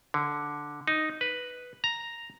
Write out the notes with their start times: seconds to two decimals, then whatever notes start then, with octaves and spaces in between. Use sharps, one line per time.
0.14 D3
0.88 D#4
1.21 B4
1.84 A#5